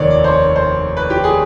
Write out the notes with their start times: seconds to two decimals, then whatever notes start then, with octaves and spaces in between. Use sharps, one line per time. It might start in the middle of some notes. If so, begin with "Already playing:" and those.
Already playing: F1 D#2 D#3 C#5 D5
0.10 D5
0.24 C5
0.28 C#5
0.56 C5
0.97 B4
1.10 G4
1.24 G#4